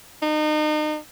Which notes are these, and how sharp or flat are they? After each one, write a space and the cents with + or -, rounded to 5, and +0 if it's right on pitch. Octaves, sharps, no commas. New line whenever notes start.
D#4 -35